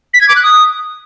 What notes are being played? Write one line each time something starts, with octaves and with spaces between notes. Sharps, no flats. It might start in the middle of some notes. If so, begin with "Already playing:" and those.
B6
G#6
D6
F#6
D#6